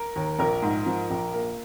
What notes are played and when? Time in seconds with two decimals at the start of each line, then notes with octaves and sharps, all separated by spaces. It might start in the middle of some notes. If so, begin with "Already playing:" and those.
Already playing: A#4
0.16 D#2
0.39 A#1 A#4
0.62 G#2
0.86 F3
1.10 A#1
1.33 A#3